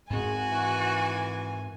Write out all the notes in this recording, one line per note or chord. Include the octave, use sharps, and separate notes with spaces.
G#2 G#3 C4 F#4 G#5
E3